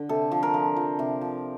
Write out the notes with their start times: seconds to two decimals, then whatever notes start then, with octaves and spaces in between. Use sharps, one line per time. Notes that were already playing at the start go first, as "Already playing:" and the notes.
Already playing: D3
0.09 C3 A4
0.32 F3
0.43 A#4
0.54 F3
0.76 F3
0.99 C3
1.21 F3